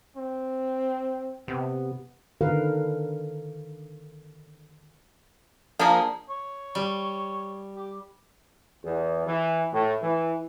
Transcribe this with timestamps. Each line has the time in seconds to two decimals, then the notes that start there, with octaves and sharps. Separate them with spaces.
0.16 C4
1.48 C3 B3
2.41 D3 D#3 A#4 B4 F5
5.79 F3 A#3 D4 G#4
6.30 C#5
6.75 G3
7.76 G4
8.85 E2
9.26 E3
9.73 A2
10.02 E3